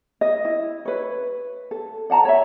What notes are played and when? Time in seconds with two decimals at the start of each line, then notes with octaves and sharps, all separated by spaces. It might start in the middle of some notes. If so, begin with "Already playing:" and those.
0.21 D#5
0.45 E4
0.85 B4 C#5
1.71 A4
2.10 D5 F#5 A5 A#5
2.25 C#5 E5